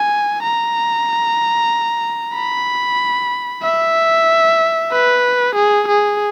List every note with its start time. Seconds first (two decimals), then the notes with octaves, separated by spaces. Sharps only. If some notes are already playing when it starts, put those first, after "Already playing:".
Already playing: G#5
0.43 A#5
2.35 B5
3.63 E5
4.92 B4
5.55 G#4
5.88 G#4